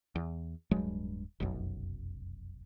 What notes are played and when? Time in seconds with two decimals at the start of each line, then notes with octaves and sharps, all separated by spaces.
0.16 E2
0.71 D1 G2 F#3 G#3
1.40 F1 B1 F#2